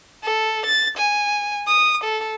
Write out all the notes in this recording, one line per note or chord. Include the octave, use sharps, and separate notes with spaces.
A4
A6
G#5
D#6
A4